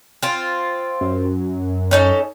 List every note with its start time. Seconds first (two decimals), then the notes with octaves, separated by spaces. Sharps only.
0.23 C4 F4
1.01 F#2
1.91 C#4 D#4 A4